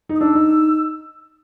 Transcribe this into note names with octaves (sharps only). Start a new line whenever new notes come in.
D#4
D#6
D4 E6
D#4